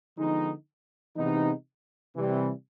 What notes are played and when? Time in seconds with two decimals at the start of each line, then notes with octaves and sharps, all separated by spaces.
0.17 D3 F3 G#3 B3 D#4
1.16 C3 E3 G#3 B3 D#4
2.16 C3 E3 G3